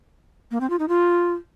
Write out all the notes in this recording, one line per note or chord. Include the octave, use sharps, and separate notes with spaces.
A#3
C4
F4
D#4
F4